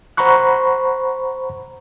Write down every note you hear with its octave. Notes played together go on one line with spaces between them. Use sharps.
C5 F#5 A#5 B5 C#6 F#6